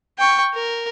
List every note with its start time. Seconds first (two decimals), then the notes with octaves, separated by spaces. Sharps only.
0.18 G5 C#6
0.54 A#4